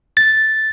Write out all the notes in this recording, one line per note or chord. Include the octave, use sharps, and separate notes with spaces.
A6